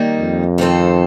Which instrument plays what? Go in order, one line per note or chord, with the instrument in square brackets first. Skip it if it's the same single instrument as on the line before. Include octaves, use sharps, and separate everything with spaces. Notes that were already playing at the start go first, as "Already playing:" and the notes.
Already playing: [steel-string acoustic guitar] D#3 G3 A#3 D#4
[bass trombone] F2
[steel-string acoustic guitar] D#3 A3 C4 F4 A4